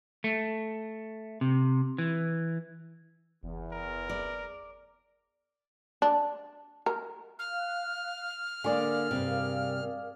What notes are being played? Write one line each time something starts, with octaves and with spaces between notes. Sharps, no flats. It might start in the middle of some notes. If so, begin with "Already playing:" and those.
A3
C3
E3
F#1 E2
A#4
D5
D4
A#4
F5 F6 F#6
D3 A#3 G#4 A#4 D5 F5 G#5
G2 C3